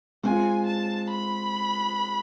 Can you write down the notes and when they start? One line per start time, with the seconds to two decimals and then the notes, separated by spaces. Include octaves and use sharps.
0.24 G#3 C4 F4 G#5
0.67 A5
1.10 B5